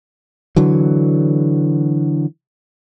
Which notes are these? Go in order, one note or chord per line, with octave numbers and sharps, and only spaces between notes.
D3 E3 F#3